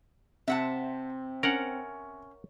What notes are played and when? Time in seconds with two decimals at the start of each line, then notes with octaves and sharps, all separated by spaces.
0.48 C3 C4 E5 F#5 A5
1.43 C#4 A#4 F#5